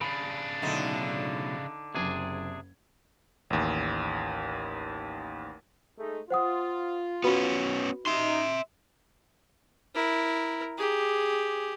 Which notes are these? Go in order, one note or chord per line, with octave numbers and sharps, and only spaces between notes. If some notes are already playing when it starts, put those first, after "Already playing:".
C#3 D4 B5 C7 D7
B1 A2 D3 D#4
F#1 C3 D4 G#4 G#6
A1 D#2
G#3 A3 D#4
F4 C5 F#5 D#6
B3 C#4 F#4 B4 B5
D#4 E5 C6
E4 A#4
G4 G#4